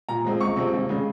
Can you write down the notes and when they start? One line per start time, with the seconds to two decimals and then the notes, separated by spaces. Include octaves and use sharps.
0.09 A#2 A#5
0.25 F3 G#3 C4
0.41 C#2 C#6
0.56 C3 F3 G#3 C4
0.73 D#2
0.89 C#3 G#3